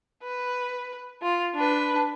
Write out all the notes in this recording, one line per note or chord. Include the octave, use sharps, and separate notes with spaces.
B4
F4
D4 B4